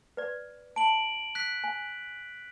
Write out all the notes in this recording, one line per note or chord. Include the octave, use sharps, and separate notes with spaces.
B4 D5
A5 D7 F#7
F#6 B6
G#5